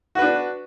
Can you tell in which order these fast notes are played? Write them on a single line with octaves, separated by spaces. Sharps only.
F#4 B4 D4